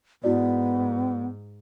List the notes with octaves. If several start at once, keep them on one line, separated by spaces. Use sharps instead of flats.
G#2 B3 E4 F#4 D5